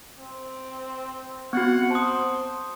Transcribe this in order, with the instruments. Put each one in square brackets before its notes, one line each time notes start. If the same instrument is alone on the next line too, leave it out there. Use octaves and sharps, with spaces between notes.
[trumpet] C4
[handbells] B3 C4 F#4 [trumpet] F#5
[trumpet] C5 [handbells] A5 D#6